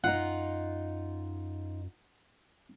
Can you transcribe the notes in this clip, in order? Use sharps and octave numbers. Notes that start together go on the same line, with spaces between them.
F#2 D#4 F4 F#5